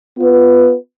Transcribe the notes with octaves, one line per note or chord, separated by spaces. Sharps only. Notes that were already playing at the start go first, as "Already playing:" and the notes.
B3 F4 B4